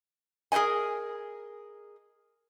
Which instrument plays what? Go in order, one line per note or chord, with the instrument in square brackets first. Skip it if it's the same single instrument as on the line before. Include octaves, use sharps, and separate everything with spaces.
[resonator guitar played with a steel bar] G#4 A#4 C5 D#5 G#5